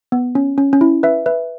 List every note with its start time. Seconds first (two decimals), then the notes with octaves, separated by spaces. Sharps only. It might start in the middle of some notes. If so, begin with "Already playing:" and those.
0.12 B3
0.35 C#4
0.58 C#4
0.73 C#4
0.81 E4
1.03 B4 E5
1.26 B4 E5